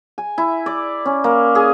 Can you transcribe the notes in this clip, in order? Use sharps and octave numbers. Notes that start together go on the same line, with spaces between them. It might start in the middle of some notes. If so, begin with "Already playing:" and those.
G#5
E4
D5
C#4
A#3
G#4